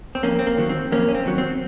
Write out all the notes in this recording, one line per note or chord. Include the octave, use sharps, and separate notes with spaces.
C4
F2 A#3 C#4
C4
A#3
D#3 F#3
C4
F2 A#3 C#4
C#4
C4
D#3 F#3
C4